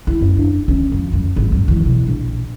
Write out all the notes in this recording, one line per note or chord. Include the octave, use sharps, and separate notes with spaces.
E4
F#2
D4
C#4
F2
F#2
G#1
F#2
E3
B2
A#1